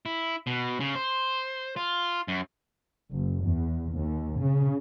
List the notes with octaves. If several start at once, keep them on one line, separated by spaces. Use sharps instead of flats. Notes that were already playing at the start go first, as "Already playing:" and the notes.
E4
B2
C#3
C5
F4
F#2
F#1
E2
D#2
C#3